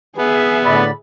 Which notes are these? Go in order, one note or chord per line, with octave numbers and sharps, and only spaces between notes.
B3 G#4 E5
A2 D3 D5 B5